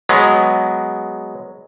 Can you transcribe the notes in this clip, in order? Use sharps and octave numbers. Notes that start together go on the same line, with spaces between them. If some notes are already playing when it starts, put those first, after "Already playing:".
F#3 G#3 B3